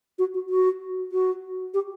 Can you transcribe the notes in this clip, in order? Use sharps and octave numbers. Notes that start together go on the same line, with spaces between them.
F#4
F#4
F#4
F#4
G4